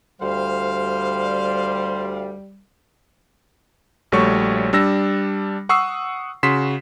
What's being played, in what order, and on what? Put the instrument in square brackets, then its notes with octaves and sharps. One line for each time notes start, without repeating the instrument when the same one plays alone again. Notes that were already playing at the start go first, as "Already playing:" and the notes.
[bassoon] D2 [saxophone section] G3 [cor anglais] C5 [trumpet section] F5
[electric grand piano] A#1 G3 A3 F#4 C#5 C#6
G3 D4 E6 A#6
F#5 C#6 D#6 E6 C7
C#3 F#4 C6 B6 C7 E7